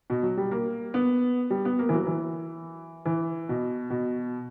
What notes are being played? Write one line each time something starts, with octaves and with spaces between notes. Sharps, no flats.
B2
F#3
G3
A#3
B3
G3
B3
A#3
E3
F#3
E3
E3
B2
B2